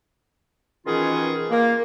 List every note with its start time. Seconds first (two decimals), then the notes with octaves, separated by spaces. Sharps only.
0.85 B2 D#3 E3 C#4 F4 G#4
1.51 A#3